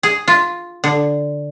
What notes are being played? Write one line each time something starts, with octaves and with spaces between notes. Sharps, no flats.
G#4
F4
D3